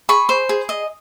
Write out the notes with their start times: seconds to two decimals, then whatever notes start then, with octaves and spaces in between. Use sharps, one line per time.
0.09 G#4 B5 C#6
0.29 C5
0.49 G#4
0.69 D#5